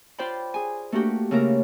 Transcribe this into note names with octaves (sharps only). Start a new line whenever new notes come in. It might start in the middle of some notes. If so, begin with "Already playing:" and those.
F4 C5 D5 G5 B5
G#4 G#5
A3 A#3 D4 F#4 G4
C#3 A3 A#3 E4 A#4